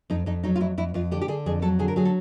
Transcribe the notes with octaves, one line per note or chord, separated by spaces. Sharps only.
F2 D#4
F2 D#4
F#3 D#4
F4
F2 E4
F2 E4
F2 F4
D3 G4
G4
D3 G#4
F2 G#4
F#3 A4
D3 G#4
A#4
F#3 G#4
A4